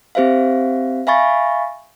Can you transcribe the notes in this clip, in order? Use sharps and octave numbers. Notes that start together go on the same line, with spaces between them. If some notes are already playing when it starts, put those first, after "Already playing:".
C4 G4 C5 E5 F5
E5 F5 G#5 B5 C#6 A6